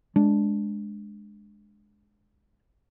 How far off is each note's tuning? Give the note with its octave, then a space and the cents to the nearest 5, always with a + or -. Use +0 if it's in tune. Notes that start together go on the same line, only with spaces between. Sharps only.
G#3 +0 D4 -10